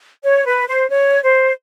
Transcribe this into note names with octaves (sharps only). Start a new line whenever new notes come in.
C#5
B4
C5
C#5
C5